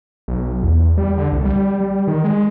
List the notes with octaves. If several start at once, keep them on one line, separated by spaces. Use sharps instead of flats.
B1
E2
G3
D3
C2
G3
G3
D#3
G#3